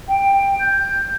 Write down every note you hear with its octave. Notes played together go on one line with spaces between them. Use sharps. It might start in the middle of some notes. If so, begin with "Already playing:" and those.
G5
G6